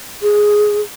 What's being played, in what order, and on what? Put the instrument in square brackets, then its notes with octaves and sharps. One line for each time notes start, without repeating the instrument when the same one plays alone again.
[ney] G#4